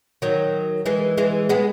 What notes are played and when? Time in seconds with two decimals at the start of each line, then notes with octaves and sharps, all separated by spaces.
0.22 D#3 F#3
0.86 E3 G#3
1.18 E3 G#3
1.49 G#3 B3